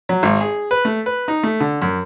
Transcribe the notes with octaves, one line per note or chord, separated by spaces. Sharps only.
F#3
G#1
G#4
B4
A3
B4
D#4
A3
D3
F#2